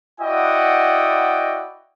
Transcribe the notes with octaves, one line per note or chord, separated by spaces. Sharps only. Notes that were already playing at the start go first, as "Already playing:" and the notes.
E4 F#4 D5 D#5 F#5 G5